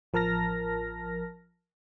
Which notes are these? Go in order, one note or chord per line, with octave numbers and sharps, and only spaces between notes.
A1 F3 A#4 A5 F6 A#6